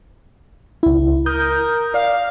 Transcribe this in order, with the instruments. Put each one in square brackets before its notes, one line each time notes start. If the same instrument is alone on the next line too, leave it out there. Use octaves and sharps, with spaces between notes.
[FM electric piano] C#2 E4
[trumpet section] A#4 [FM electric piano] D#6 G6
[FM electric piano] D5 [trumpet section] F5